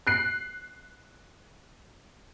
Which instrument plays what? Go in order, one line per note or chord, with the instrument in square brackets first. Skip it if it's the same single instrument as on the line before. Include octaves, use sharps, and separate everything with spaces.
[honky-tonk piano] F#6 C7